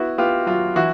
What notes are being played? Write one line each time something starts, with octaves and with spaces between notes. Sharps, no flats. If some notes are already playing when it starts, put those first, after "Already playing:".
Already playing: B3 E4 F#4
B3 F4 G4
F#3 F4
E3 E4 F#4